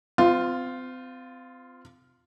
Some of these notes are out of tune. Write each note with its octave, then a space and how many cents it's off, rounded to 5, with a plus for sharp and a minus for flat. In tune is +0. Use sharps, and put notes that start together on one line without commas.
C4 -35 F4 +0